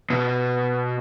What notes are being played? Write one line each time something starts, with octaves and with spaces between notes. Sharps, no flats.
B2